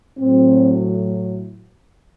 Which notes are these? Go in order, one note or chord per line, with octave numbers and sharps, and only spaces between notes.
A2 F#3 C4